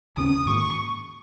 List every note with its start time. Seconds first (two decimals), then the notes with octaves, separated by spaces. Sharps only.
0.17 D#2 C#3 A#3 C#4 D#6
0.46 G#2 D#3 A#3 C#6